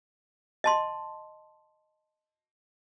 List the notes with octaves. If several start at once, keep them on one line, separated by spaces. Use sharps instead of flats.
D#5 A5 C6